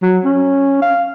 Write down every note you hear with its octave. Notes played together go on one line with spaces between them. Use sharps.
F#3
C#4
F5